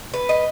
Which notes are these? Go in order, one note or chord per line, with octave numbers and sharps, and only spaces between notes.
B4
D#5